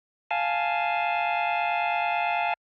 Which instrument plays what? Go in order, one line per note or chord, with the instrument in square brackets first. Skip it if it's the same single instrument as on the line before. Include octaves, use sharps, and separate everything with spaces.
[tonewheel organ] F5 G#5 A5